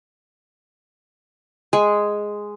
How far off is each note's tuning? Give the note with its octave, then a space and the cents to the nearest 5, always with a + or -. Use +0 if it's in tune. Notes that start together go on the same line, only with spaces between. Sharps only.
G#3 +0 G#5 +0